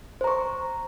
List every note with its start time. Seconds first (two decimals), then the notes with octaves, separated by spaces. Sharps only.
0.21 C5
0.24 A#5
0.27 C#6